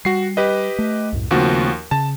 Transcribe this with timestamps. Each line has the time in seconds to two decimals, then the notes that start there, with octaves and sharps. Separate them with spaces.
0.05 G3 F#4 C7
0.37 G4 B4 D#5
0.79 A3
1.12 C2 F#2 A2
1.31 D#2 C#3 F3 A3 C4 F#4
1.91 C#3 A5